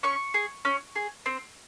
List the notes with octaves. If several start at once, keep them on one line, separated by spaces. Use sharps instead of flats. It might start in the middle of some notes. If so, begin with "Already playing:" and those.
C#4 C#6
G#4
C#4
G#4
C4